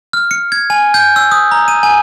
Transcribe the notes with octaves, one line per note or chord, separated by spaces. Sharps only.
F6
C#7
G#6
G#5
G6
E6
D#6
A#5
D#7
G#5